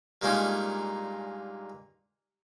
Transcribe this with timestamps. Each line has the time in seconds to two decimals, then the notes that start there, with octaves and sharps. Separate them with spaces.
0.22 G2 A#2 G#3 A#3 C#4 D#4